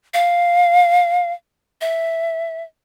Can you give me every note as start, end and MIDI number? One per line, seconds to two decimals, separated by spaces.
0.14 1.32 77
1.81 2.63 76